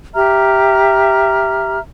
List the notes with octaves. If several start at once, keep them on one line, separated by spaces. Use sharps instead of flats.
G4 E5 A#5 F6